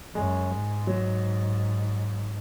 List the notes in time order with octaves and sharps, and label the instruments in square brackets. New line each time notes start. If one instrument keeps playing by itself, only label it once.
[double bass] F#2 [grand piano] G#3
[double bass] G#2
[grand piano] F#3